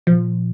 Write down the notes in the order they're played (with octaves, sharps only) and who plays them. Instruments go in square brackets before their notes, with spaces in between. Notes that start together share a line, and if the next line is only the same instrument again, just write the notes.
[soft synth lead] A#2 [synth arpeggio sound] F3